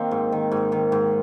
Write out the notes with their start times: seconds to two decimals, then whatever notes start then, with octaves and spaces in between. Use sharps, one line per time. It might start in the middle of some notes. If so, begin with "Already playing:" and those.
Already playing: D#3 A#3 C4
0.11 G#2
0.32 D#3
0.52 G#2
0.72 D#3
0.92 G#2